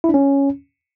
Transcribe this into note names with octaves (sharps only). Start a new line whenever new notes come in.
E4
D4
C#4